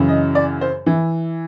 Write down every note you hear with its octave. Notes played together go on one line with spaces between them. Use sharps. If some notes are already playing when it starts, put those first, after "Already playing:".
Already playing: F#2 C#3 E3
D#5
D5
C5
E3